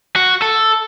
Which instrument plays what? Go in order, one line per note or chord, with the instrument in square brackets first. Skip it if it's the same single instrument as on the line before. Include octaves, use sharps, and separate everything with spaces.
[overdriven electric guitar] F#4
A4